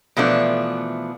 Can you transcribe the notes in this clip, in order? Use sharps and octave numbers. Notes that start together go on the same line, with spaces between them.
B2 E3 F3 A3 B3 D4